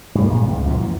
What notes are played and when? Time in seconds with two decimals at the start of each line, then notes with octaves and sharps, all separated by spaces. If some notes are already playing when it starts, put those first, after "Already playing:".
0.15 G2
0.28 D1 A#2 G#3
0.45 C#2 C#3
0.66 F#2 A#2 E3 F3
0.83 E3